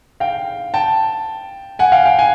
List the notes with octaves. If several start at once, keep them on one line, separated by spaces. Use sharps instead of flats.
F5 G5
G5 A5
F#5 G#5
F5 G5
F5 G5
F#5 G#5